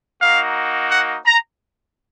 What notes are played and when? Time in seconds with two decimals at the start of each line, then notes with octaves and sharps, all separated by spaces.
0.22 A#3 D#4 F#4 F5
0.91 F#5
1.26 A#5